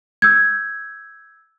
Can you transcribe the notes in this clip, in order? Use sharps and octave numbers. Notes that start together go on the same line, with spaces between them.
E6 G6 G#6